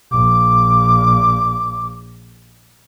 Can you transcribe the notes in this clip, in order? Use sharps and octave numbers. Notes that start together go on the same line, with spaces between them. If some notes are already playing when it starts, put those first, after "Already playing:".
A#1 D6